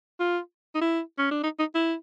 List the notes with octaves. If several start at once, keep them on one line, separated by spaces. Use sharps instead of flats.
F4
D#4
E4
C#4
D4
D#4
D#4
E4